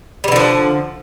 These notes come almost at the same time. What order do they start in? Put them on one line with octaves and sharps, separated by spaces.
G3 E3 D3 F3